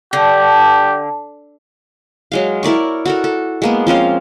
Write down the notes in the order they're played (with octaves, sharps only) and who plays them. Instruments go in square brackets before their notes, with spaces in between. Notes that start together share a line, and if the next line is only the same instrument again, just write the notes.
[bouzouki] D3 [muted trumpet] G4
[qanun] F#3 G#3 F5
E4 A#4 D5 C#6
F#4 A4 A#4
A4
G#3 A#3 B3
F3 C4 C#4 F5